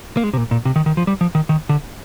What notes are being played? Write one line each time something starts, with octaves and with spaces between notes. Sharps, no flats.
A#3
G#3
C3
A#2
A#2
C3
D#3
D#3
F3
G3
F3
D#3
D#3
D3